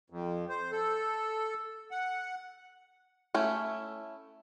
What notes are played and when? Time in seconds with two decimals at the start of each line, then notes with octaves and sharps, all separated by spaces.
0.10 F2
0.49 C5
0.72 A4
1.91 F#5
3.34 A3 C#4 E4